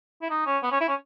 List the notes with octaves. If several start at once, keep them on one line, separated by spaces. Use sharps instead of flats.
E4
D#4
C#4
B3
C#4
E4
C#4